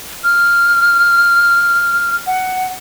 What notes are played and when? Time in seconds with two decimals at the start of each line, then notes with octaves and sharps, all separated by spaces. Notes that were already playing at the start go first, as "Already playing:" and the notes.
0.24 F6
2.27 F#5